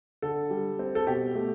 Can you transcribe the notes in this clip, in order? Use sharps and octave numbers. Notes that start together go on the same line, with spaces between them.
D3 A4
G3
C4
A4
B2 G4
A3